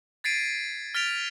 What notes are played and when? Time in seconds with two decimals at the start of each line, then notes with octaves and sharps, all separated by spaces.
0.24 G#6 A6 B6 C7 D7 D#7
0.94 F6 A6 B6 D7 F7